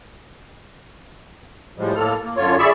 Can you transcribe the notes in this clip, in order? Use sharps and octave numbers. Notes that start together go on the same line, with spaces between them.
A2 F3 G3 G#3
A2 A#3 A4 F6
A#3
F#2 D3 F4 C#5
G#4 D5 E5 B5 C#6 E6